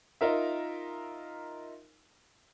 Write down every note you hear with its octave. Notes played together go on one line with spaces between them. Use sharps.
D#4 F4 A#4 E5